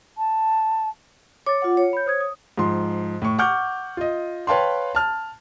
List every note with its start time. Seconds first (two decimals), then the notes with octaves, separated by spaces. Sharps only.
0.18 A5
1.46 C#5 D6 A6
1.62 F4 F#5
1.77 C#5
1.93 B5 G6
2.06 C5 D#6 G#6
2.20 D#6
2.58 G#2 F3 C6
3.22 A2 C#6
3.38 F#5 C#6 D6 F6 G6
3.97 F4 D#5
4.47 B4 C#5 F5 G5 A5 C6
4.95 A5 F6